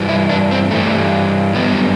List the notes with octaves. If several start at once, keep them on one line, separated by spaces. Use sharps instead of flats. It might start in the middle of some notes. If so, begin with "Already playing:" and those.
Already playing: G2 E3 G3
E4
D4
C4
G2 E3 G3 A3
F#2 D3 G3 B3